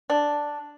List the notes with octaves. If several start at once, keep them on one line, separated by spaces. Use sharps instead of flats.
D4